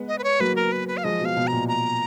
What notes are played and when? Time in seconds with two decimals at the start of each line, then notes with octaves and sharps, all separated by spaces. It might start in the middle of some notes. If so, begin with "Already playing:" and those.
Already playing: G#3 B3
0.08 D#5
0.19 B4
0.24 C#5
0.40 F#3 A#3 B4
0.56 A#4
0.72 B4
0.88 B4
0.97 F5
1.04 F3 G#3 D#5
1.20 B2 F5
1.37 B2
1.47 A#5
1.53 A#2
1.68 A#5